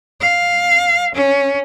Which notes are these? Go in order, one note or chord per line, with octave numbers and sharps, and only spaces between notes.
F5
C#4